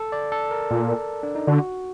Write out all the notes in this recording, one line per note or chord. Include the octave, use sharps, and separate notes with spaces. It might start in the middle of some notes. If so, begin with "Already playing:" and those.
Already playing: A4
D5
A4
A#4
A#2
D4
D#4
D3 F#4